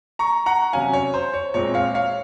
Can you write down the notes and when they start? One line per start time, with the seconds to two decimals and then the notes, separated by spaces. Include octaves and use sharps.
0.19 A#5 C#6
0.46 F#5 A#5
0.73 C3 F#3 C#4 F5 G#5
0.93 C#5
1.14 C5
1.34 C#5
1.54 A#2 G#3 C4 C#5
1.74 C#5 F5
1.94 C#5 F5